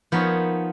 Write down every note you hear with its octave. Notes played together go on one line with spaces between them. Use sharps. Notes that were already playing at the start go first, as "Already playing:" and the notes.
F3 B3 D#4 A#4 C#5